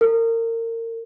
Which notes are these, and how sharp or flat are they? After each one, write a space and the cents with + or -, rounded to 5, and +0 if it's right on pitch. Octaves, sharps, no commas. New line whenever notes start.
A#4 -30